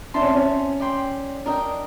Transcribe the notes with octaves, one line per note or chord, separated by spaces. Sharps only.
D4 C5 E5 A5 C6
C#4
C4
C#4
D5 G5 C6
D4 A#4 D#5 G5